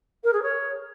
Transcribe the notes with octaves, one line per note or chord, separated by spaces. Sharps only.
A#4
G#4
C#5